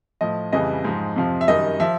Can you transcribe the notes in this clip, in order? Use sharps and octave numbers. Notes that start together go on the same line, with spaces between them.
A2 F3 D#5
F2 C#3 E3 G3 D#5
G#2 F3
F2 C3 F3
E5
F#2 D#3 G3 D#5
F3 E5